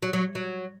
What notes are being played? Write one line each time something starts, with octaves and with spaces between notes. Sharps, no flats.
F#3
F#3
F#3